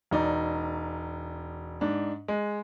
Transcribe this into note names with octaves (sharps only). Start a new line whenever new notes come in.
E1 D#4 D5
G#2 D4
G#3